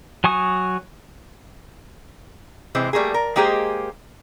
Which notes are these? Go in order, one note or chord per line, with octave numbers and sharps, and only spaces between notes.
F#3 G#5 C#6 D#6
C3 E3 G#3 C4
G3 A3 A#3 G#4
A#4
G#3 A#3 G4 G#4 C5 D#5